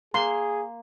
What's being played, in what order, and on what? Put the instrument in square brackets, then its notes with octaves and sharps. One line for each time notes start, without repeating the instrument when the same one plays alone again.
[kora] A#3 [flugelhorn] G#4 [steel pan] C6